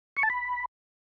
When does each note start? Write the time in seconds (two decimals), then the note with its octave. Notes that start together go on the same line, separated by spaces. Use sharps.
0.17 C#6
0.23 A5
0.30 B5